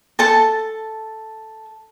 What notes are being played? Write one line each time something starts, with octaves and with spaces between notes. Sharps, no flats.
A4 A5